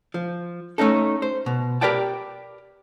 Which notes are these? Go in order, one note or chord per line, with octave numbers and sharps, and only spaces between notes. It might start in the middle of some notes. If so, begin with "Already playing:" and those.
F3
A3 C#4 D#4 A4
C5
B2
G4 A#4 B4 D5 G5 A5